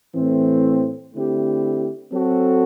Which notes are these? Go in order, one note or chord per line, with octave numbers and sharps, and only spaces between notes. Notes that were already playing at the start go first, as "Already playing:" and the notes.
A2 E3 A3 C4
D3 A3 C4 E4 G4
F#3 C4 F#4 A4